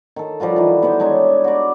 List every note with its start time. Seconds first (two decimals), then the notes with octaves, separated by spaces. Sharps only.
0.16 D#3 A4
0.40 F3 G3 F4 F#4
0.56 D#3 E3
0.83 B3 G4 C5
1.00 G#3 D4 D#4 C#5
1.44 F#4 D5